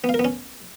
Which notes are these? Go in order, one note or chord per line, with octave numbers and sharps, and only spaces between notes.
B3
F5
A#4
B3
C#4